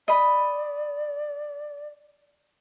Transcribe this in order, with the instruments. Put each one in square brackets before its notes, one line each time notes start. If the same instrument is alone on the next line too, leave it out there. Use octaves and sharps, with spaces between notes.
[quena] D5 [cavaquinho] D#5 B5